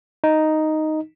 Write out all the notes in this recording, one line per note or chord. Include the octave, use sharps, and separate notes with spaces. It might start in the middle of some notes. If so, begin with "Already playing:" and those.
D#4